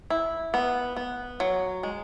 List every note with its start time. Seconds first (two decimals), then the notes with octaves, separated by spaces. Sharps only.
0.10 E4
0.54 B3
0.96 B3
1.40 F#3
1.83 G#3